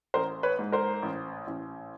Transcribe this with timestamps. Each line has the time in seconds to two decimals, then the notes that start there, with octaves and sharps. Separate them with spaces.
0.14 A1 A#4 C5
0.43 B4 C#5
0.59 G#2
0.72 A#4 C5
1.02 A1
1.47 A1